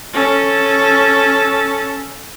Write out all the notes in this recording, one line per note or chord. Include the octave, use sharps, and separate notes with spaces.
C#4 A4